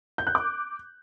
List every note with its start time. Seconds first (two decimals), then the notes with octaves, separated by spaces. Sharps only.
0.18 G6
0.27 F#6
0.35 D6